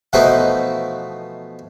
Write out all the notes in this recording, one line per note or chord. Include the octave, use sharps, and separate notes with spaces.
B2 E3 F3 A3 D#4 F#4